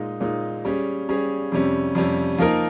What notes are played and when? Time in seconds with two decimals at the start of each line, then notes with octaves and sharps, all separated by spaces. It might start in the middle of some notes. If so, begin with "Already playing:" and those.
Already playing: A#2 G#3 D#4
0.21 A#2 G#3 D#4
0.65 G3 C#4 G#4
1.09 G3 C#4 G#4
1.52 F2 C3 G3 C#4
1.95 F2 C3 G3 C#4
2.38 F3 A#3 D#4 A#4